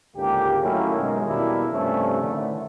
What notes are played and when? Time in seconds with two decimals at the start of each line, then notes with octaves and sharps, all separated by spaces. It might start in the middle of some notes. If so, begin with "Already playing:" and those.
0.16 C#2 G#2 D3 A#3 G4
0.62 D#3 F#3 A3 A#3 C#4 E4
0.96 F#2 B2 D#3 G#3
1.26 E2 B2 G3 A#3 D4 E4
1.72 G2 C3 F3 G3 A3 C#4
2.21 A2 D3 D#3 A3